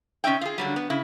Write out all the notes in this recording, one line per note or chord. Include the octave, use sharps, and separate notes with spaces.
C3 C#4 D#4 E5 G5
F4 G#4
D3 F#3 G3
B3
C#3 E4